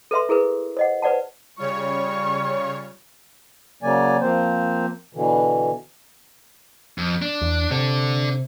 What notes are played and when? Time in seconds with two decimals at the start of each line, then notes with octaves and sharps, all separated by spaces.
0.11 A4 B4 E5 C6
0.29 E4 G#4 A#4 B4
0.77 C5 D#5 F#5
1.02 B4 C5 D5 F#5 A5
1.59 C#3 G3 F4 C#5 C#6
3.83 C#3 F#3 A#3 D5 G#5
4.21 F3 A#3 C4 C5
5.14 B2 D3 E3
6.98 F2
7.22 D4
7.41 E2
7.71 C3 D4 A4